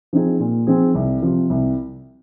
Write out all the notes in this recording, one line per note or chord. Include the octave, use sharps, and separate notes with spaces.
F3 C4 D#4 G#4
A#2
F3 C4 D#4 G#4
C2
C3 F3
C2